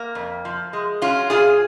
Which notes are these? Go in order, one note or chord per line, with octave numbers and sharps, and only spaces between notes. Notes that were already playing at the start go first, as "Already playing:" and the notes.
Already playing: A#3
F2
F3
G#3
F#3 C#4 F4
A#2 F4 G#4